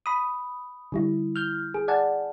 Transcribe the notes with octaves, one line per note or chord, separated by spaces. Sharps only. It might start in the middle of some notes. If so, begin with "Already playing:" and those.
B5 D#6
D3 G3 E4
F6 G6
G#4
D5 F#5 G#5 A5